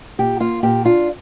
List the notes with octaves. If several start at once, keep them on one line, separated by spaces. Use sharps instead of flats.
A#2 G4
A#3 F4
A#2 G4
D4 F4